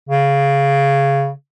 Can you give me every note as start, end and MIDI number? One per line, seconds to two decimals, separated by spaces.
0.09 1.31 49